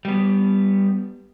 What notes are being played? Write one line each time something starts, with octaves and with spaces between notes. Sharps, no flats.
G3 B3